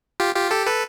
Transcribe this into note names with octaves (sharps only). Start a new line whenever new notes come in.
F4 G4
F4 G4
G4 A4
A4 B4